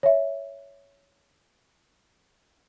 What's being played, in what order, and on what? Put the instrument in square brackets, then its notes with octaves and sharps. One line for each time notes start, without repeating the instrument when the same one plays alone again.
[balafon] C#5 E5